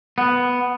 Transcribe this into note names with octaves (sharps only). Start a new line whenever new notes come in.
B3